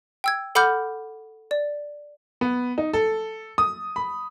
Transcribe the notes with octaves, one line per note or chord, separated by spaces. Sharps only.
G5 E6 G#6
A4 F#5 B5 D6 F6 G6
D5
B3
D#4
A4
D#6
B5